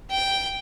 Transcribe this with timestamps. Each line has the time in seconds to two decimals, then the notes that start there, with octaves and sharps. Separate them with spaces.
0.10 G5